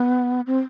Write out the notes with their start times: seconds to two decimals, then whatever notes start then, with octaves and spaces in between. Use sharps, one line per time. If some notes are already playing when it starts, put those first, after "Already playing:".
Already playing: B3
0.47 C4